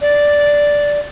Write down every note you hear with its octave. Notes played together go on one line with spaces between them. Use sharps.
D5